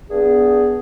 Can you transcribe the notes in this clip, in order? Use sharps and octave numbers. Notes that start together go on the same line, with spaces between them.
G2 B3 G#4